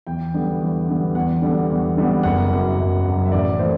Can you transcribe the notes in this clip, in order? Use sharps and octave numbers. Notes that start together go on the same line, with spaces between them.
E2 G5
D3 G3 B3
E2
D3 G3 B3
E2 F#5
D3 G3 B3
E2
D3 G3 B3
F#1 F#5
F#2 F#3
F#1
F#2 F#3
E5
A1 D5
A2 E3 A3 C5